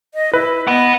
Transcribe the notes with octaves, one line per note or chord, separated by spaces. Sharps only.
D#5
E4 B4
D#5 F#5 B5